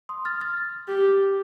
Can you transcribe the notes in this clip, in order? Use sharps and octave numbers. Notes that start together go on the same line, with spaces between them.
C6 D#6
F6 A6
F6 A6
G4